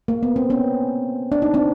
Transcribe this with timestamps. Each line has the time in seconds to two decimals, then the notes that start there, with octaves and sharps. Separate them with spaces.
0.08 A#3
0.23 B3
0.36 C4
0.50 B3 C#4
1.32 D4
1.42 D#4
1.54 C4 D4